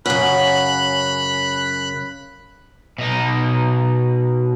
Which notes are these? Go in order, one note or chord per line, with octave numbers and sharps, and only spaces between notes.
F#2 C#3 B5 F#6
B2 D#4